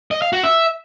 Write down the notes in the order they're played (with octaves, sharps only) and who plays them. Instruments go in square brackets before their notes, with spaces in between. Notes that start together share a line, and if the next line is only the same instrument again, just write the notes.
[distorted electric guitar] D#5
F5
F#4
E5